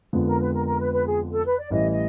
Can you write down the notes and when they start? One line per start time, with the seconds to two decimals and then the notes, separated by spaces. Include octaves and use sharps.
0.13 F2 D3 F3 G#3 B3
0.26 A#4
0.39 B4
0.52 A#4
0.65 A#4
0.79 B4
0.92 B4
1.05 G#4
1.31 A4
1.45 B4
1.58 D5
1.71 A1 A2 E3 G3 D#5
1.90 D#5